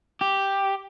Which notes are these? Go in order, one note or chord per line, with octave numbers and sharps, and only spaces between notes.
G4